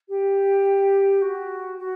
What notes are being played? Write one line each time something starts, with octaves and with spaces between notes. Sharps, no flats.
G4
F#4
F#4